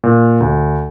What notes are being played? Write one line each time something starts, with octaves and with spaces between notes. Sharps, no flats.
A#2
D2